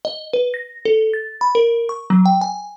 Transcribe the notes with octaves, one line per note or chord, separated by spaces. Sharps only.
D#5
B4
A#6
A4
A6
B5
A#4
C#6
F#3
G5
G#5